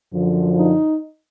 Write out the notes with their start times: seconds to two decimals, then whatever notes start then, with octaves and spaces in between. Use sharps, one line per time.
0.11 F#2 D3 F3
0.56 D#4